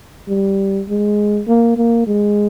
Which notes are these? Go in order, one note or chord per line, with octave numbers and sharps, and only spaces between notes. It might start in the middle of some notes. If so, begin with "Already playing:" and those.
G3
G#3
A#3
A#3
G#3